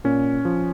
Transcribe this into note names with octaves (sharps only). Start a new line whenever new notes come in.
A#2 C#4
F3